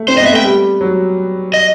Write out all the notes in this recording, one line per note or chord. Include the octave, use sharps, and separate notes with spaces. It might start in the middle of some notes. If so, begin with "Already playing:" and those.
Already playing: A3
C4 C5
D#5
B3
E5
A3 G5
G3
F#3
D#5